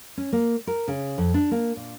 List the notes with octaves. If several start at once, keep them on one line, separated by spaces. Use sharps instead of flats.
C#4
A#3
A#4
C#3
F2
D4
A#3
A#2